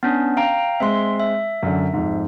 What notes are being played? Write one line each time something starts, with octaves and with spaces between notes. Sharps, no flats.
B3 C#4 D4
F5 G5 A#5
G#3 C4 E5 C6
E5
F#2 D3
F2 G#2